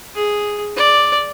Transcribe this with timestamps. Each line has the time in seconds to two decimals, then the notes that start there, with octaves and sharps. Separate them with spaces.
0.15 G#4
0.77 D5